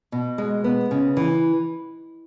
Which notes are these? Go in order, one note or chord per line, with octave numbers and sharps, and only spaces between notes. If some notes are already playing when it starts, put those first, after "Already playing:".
B2
G#3
B3
C#3
E3